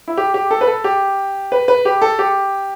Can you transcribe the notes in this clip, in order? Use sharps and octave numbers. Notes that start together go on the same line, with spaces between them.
E4
G4
G4
A4
B4
A4
G4
B4
B4
G4
A4
G4